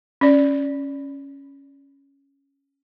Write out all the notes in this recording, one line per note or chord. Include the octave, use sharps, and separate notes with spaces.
C#4 D5